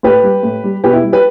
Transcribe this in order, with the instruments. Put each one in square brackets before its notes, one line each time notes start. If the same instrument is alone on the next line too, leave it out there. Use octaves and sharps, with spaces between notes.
[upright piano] A2 G4 B4
G3
A2
G3
B2 G4 B4
E4
G3
G4 B4